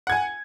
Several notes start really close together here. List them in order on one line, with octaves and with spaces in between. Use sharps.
F#5 G#6 G#5